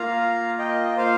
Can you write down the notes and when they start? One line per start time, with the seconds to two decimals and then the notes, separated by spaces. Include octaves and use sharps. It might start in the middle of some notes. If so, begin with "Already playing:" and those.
Already playing: A#3 F4 F5 A#5
0.59 D#5 G5
0.97 C5 F5